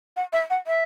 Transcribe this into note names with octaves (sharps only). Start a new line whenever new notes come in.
F#5
E5
F#5
E5